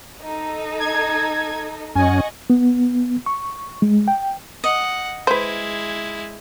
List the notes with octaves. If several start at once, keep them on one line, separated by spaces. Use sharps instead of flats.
D#4 A4
G#6
F#2 C#4 D#5 F#5 G#5 C#6
B3
C#6
G#3
G5
D#5 F#5
G#3 E4 B4 C5